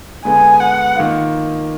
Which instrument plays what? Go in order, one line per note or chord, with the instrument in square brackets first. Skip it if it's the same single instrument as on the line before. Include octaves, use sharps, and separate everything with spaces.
[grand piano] D3 G#3 B3 [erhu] G#5
[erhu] F#5
[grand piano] D#3 A#3 F4